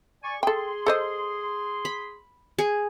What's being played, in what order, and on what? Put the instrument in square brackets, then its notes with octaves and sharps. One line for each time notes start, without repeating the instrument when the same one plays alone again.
[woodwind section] D5 G#5 C#6
[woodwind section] G#4 C6 [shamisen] A4 G5
[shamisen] A4 C5 D#5
[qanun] B5
G#4